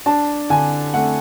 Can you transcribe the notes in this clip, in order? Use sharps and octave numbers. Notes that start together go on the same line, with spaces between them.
D4 A5
D3 G#5
A3 F#5